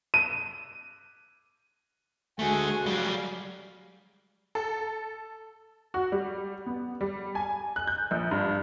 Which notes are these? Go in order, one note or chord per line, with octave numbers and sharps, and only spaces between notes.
D#7
D3 G#3 A3 F#4 G#4
F#3 G3 F5
A4
F#4
G3
B3
G3
G#5
F#6
G6
A#1
G2